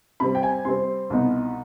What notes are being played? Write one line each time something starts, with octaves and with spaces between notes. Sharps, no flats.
C3 G3 C4 B5
G5
G#5
C3 G3 C4 C6
C2 B2 B3 D#4